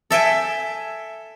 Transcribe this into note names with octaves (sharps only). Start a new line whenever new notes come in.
A4 E5 G5 G#5